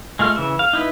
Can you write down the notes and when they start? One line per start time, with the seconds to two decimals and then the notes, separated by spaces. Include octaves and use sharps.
0.19 G#3 A3 F4 F6
0.36 C#3 E3 E5
0.59 F5
0.73 D#4 E4 B4